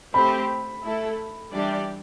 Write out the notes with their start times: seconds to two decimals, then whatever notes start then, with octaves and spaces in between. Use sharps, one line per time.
0.14 A3 C4 G4 C5 B5
0.83 A3 E4 A4
1.51 E3 G3 D4 G4 D5